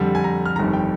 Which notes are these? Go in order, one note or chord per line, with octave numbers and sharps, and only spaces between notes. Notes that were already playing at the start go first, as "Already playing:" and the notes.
Already playing: F2 D3 G3
G#5
A#5
F6
G1 F2 D#3 G3 A#5
G5